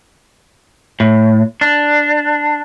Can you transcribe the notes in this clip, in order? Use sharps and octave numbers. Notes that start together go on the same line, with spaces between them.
A2
D4